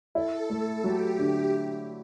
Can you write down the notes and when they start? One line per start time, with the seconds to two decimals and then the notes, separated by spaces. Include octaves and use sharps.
0.15 E4 A4
0.50 A3
0.84 F#3 G4
1.19 D3